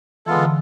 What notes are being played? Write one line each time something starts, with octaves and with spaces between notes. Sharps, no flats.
E3 G#3 B3 F4 A4
D3
E3